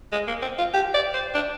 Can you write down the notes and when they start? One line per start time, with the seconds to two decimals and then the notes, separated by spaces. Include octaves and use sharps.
0.12 G#3
0.27 A#3
0.42 C4
0.58 F4
0.74 G4
0.94 D5
1.14 C5
1.34 D4